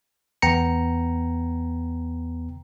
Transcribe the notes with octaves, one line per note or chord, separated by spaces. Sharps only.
E2 B3 G5 A#5 C#7